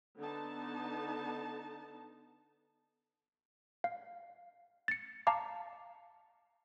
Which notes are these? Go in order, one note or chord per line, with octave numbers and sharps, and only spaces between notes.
D3 B3 D#4 A5
F5
A6 C#7
F5 A5 A#5 D6